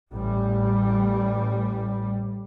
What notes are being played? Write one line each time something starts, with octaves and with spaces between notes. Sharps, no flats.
A1 G3